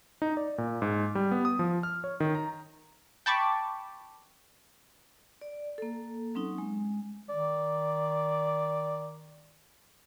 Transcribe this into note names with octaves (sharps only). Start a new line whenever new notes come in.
D#4
D5
A#2
G#2
G3
B3
D#6
F3
F6
C#5
D#3
A#5
G5 A5 B5 C#6 D6
D5
A#3 A4
F#3 C4 C#4 D#4
G#3
D#3 D5